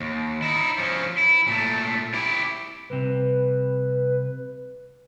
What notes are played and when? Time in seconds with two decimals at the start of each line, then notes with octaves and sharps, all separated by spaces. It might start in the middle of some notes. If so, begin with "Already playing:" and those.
0.01 D#2
0.43 D#4 E4
0.78 F3 C#4
1.18 E4
1.48 A#2 A3
2.14 E4 G4
2.90 C2 C3 B4